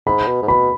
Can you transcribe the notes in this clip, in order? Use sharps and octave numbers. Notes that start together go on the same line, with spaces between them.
G#2 B5
B2
G#2
B2 B5